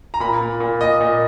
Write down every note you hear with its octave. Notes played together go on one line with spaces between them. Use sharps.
A#5
A#2 B5
A#2
A#2
A#2 D#5
A#2